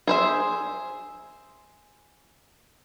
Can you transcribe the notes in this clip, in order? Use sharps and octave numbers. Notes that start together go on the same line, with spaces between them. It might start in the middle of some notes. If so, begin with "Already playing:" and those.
G#4 C5 E5